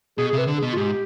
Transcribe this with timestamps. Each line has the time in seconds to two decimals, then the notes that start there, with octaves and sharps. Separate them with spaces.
0.18 B2 G#4
0.28 C3 G#4
0.38 B4
0.47 D3
0.58 G#4
0.63 B2
0.73 F4
0.77 G#2 G4